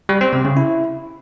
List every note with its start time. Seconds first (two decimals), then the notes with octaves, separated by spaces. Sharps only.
0.09 G3
0.21 C4
0.33 C3
0.45 C#3
0.57 E4